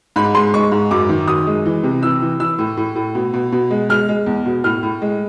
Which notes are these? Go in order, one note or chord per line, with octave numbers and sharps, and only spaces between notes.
G#2 B5
G#3 C6
G#3 C#6
G#2
F#2 D6
D#3
F#2 D#6
G#3
E3
C3
E3 E6
E3
E3 E6
A2
A2
A2
B2
B2
B2
G#3
G#3 F6
G#3
E2
B2
A2 F6
A2
G#3